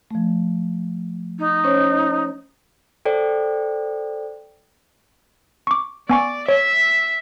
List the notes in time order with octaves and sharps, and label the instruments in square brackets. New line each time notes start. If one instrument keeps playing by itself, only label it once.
[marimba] F3 A3
[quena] D#4
[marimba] C#4 C5 C#5
[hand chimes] A4 C5 D5 G5
[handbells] C#6 D6
[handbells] B3 G#5 C#6 [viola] D5
[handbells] C#5 [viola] E5